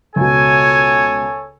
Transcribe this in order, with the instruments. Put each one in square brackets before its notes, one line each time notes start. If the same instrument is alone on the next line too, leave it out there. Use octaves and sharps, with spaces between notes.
[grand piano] C#2 B2 [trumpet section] A4 C#5 G#5